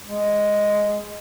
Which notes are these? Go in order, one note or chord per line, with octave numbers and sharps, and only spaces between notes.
G#3